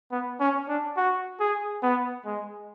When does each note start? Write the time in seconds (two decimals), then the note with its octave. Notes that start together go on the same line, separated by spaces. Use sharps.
0.11 B3
0.40 C#4
0.68 D4
0.97 F#4
1.40 G#4
1.83 B3
2.25 G#3